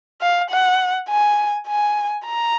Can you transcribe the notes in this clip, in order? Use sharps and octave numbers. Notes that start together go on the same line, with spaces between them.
F5
F#5
G#5
G#5
A#5